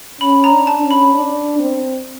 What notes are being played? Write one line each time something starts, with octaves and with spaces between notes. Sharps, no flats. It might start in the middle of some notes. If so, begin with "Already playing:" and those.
C#4 B5
A#5
D4
A5
C#4
B5
D4
C4